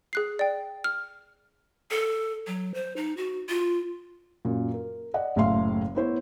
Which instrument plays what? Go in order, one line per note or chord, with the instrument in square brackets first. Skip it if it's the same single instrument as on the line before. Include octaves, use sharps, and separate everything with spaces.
[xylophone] G#4 F#6 C7
D5 G5
F6
[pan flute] A4
F#3
C5
D#4
F#4
F4
[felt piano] F#2 A#2
A#4
D5 D#5 F#5
F#1 A2 A3 E5 F5 C6
B3 E4 C5 C#5